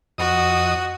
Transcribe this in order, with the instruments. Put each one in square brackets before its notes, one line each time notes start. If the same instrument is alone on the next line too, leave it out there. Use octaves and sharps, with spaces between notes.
[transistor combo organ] F2 D#5 D#6 [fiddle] F#4